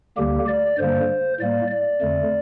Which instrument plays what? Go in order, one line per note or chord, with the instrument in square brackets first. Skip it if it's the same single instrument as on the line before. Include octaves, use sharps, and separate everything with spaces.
[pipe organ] D2 D3 G3 A#3 G4
D5
G2 D3 G3 A#3 C5
A2 G3 A#3 D5
D5
F2 D3 A3